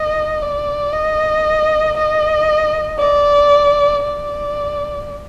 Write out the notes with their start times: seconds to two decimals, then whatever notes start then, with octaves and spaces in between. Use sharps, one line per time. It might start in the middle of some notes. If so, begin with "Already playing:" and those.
Already playing: D#5
0.42 D5
0.93 D#5
1.97 D#5
2.99 D5
4.04 D5